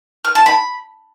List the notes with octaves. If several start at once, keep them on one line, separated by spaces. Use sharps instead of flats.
F6
A5
B5